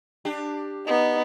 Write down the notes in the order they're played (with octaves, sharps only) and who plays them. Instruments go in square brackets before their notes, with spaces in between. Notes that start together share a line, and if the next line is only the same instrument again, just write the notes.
[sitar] D4 G4
[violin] B3 [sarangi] D#4